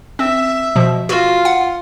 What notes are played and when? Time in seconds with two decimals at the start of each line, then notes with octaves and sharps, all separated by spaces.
0.19 C4 E5
0.76 B2 F3
1.09 F4 F#4
1.45 F#5